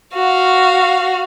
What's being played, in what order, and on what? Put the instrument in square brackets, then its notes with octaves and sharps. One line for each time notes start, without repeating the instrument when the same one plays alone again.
[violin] F#4 F5